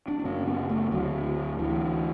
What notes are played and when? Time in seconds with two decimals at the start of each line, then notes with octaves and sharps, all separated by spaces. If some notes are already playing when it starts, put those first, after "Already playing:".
0.08 D4
0.19 D4
0.24 F#2 C#3 C#4
0.47 B3
0.69 A3
0.92 D2 D3 F#3
1.59 D2 D3 E3